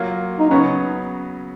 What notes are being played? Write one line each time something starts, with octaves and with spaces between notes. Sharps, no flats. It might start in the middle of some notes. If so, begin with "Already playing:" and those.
Already playing: F#3 A#3 F4
D#4
C#3 F#3 B3 C#4 F#4 C#5